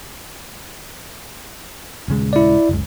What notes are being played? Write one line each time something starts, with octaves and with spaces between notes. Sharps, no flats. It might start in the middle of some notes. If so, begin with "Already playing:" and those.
D#1 C#3 G#3
E4 D5
F#1 C#2